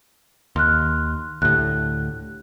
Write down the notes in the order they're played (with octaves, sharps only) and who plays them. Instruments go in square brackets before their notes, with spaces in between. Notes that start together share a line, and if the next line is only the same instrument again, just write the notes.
[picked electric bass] D#2 [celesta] C6 F6 F#6
[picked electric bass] D2 A2 [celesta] G4 F#6